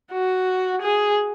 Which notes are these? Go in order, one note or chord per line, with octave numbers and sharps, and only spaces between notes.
F#4
G#4